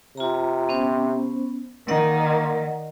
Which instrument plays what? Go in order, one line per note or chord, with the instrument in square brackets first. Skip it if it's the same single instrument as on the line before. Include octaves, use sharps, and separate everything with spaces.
[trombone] C3 [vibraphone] F4 A#5
[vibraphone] B3 C#4 C5
[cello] D#3 [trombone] A#3 [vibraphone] D5 D#5 F#5